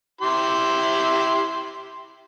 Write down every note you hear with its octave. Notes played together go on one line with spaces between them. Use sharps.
E4 G4 C6